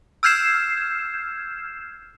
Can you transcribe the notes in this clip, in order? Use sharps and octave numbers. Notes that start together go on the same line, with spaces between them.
E6 F6 G6 G#6 C7 E7